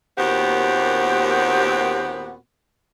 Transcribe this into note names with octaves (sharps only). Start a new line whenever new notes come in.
D#2 A#2 B3 C4 F#4 G4